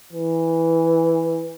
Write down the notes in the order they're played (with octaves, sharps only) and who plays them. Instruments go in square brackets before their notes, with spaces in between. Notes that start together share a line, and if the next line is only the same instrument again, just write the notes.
[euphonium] E3